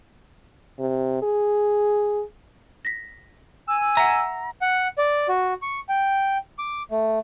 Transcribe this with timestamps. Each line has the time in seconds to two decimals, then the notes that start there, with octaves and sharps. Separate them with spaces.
0.79 C3
1.22 G#4
2.85 A#6 B6
3.68 G#5 E6
3.97 E5 F#5 A#5
4.61 F#5
4.98 D5
5.28 F#4
5.62 C#6
5.89 G5
6.59 D6
6.91 A3